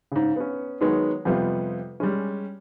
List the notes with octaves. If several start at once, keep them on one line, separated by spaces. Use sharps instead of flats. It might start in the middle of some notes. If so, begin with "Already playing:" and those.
G#2 C#3
B3 C#4
D#3 F#3 G#3 B3 D#4 C#5
F2 C3 G3 B3 F4
G3 G#3 C#4